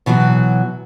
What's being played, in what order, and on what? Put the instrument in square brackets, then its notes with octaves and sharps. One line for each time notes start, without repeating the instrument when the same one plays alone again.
[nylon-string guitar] B2 E3 F#3 F#4